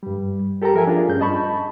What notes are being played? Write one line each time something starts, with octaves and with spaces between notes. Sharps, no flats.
G2 G3
G4 A4 A#4 G5 A#5
F3 A#4 E5 G#5
D4 F4 G#4
G2 C#4 G6
D#5 A5 B5 C#6